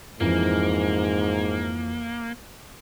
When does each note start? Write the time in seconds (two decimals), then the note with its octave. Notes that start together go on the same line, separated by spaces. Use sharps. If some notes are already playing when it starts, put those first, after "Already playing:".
0.21 F2 G#2 E3 A#3